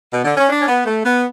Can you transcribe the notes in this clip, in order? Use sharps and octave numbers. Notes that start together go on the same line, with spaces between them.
B2
D3
C#4
D4
C#4
B3
A3
B3